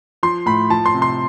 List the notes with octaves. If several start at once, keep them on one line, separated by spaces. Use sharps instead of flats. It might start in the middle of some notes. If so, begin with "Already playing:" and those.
F3 C6
A2 B5
F3 A5
C6
C3
C6